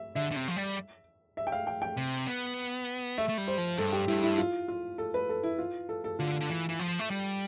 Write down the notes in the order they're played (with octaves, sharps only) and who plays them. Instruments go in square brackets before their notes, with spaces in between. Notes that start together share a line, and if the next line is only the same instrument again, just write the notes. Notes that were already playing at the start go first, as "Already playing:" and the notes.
Already playing: [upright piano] E5
[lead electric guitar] D3 [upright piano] E5
[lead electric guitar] D3
C3
F3
G3
[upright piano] E5
G5
F5
G5
G5
[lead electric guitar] C3
B3
[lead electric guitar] A3 [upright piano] E5
[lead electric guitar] A3
G3
[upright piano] C5
[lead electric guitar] F3
[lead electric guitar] G2 [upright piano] A4
[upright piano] G4
[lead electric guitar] G2 [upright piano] E4
[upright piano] E4
F4
F4
A4
B4
A4
E4
F4
A4
A4
[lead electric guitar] D3 [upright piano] F4
[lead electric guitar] D3
E3
E3
F3
A3
G3